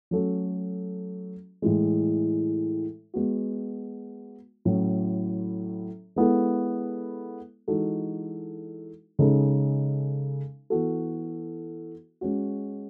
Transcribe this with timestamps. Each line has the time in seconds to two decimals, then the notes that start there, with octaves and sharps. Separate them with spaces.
0.11 F#3 A3 C#4 F#4 A4
1.62 A2 E3 G#3
3.14 G#3 B3 F#4
4.65 A2 F#3 C#4 E4
6.16 G#3 B3 E4 A4
7.68 E3 G#3 D#4 F#4 A4
9.19 C#3 G#3 D#4 A4
10.70 E3 B3 F#4 A4
12.21 G#3 C#4 F#4